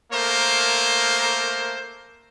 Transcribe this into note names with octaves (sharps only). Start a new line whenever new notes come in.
A3 A#3 A#4 C5